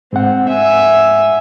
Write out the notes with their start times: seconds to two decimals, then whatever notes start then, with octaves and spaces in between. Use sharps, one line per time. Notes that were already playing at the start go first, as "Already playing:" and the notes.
0.13 G#2 C4 F#5
0.48 E5 G#5